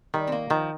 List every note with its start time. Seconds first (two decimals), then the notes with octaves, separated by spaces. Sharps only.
0.14 D#3 G3
0.27 C4
0.32 A#3
0.50 D#3 F3